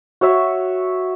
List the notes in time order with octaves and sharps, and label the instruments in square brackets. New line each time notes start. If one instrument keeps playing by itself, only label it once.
[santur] F#4 C#5 E5